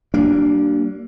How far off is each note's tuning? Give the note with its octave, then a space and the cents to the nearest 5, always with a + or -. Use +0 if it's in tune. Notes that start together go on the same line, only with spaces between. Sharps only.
G3 -40 A#3 +0 D4 +0